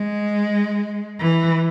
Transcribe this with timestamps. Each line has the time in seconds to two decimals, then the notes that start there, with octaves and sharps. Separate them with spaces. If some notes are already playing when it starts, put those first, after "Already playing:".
Already playing: G#3
1.20 E3